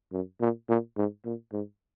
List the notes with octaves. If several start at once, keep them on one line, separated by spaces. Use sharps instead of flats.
F#2
A#2
A#2
G#2
A#2
G#2